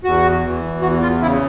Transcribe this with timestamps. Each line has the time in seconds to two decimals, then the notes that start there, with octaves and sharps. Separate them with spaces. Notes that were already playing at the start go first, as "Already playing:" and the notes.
0.04 E2 F#4
0.44 E3
0.82 E2 F#4
1.02 F4
1.20 C#3 E4